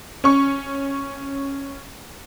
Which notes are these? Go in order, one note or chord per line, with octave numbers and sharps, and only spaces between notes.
C#4 C#6